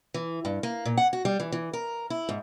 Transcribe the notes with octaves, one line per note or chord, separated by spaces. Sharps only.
E3
G2
A#3
A#2
F#5
F#4
G3
E3
E3
A#4
E4
G#2